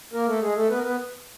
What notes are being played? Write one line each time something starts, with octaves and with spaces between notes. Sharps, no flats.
A#3 A#4
A3 A4
G#3 G#4
A3 A4
B3 B4
A#4
B3 B4